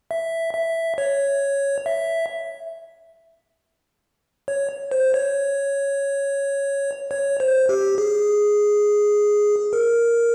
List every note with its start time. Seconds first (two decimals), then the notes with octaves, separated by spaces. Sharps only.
0.11 E5
0.54 E5
0.98 C#5
1.86 E5
4.48 C#5
4.91 C5
5.14 C#5
7.11 C#5
7.40 C5
7.69 G4
7.98 G#4
9.73 A#4